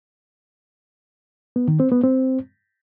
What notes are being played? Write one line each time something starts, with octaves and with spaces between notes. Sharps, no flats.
B3
D#3
C4
B3
C4